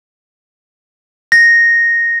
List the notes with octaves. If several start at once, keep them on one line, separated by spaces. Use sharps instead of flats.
A#6